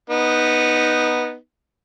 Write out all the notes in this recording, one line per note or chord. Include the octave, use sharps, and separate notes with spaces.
B3 D#4